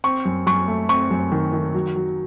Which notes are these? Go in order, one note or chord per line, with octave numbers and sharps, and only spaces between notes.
C4 C#6
F#2
F#2 C#6
A3
C4 C#6
F#2
D#3
D#3
F#3
F#3